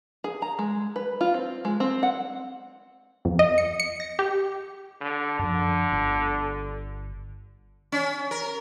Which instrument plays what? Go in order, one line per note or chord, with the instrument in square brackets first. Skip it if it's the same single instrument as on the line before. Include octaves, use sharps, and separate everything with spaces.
[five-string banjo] G#4
A#5
G#3
B4
F4
C4
G#3
C4
F#5
[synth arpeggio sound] F2
D#5
C#7
C#7
A#6
G4
[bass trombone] D3
[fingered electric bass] F#2 F3 [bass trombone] D3
[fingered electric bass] G1
[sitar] C#4
A#4